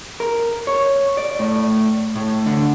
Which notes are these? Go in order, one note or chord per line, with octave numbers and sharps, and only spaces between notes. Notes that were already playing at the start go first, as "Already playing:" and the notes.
A#4
C#5
D5
A2
A2
D3